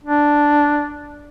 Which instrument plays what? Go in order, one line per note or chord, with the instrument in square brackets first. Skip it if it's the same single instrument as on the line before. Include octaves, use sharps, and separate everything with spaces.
[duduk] D4